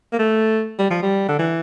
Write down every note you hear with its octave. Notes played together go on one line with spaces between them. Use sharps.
A#3
A3
G3
F3
G3
D3
E3